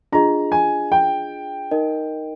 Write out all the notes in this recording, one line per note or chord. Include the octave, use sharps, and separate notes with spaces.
D4 F4 G#4 D#5 A#5
G#5
G5
D#4 A#4 D#5